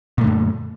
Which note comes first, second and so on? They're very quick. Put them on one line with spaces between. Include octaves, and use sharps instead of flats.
A#2 A3 D3 F#2